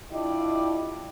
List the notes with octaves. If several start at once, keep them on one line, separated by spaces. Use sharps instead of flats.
D4 E4 F4 G4 D5 D#5